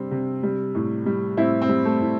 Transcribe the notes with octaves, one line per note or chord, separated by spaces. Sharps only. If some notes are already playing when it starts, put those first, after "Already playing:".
Already playing: C3 G3 C4 D4
C3
G3
A2
G3
A2 C4 E4
C4
G3
A3
A2